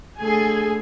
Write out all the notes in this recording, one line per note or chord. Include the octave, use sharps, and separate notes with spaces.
D3 A3 G#4 A4 G#5